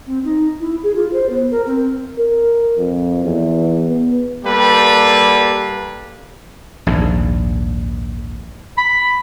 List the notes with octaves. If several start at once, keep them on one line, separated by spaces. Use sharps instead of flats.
C4
D#4
E4
G#4
F4
C5
B3
A#4
C4
A#4
F2
E2
B3
G3 A#3 G4 A4 B4
A#1 D#2 G#2
B5